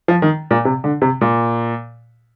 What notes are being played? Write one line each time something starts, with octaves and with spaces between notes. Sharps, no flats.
F3
D#3
A#2
C3
D3
C3
A#2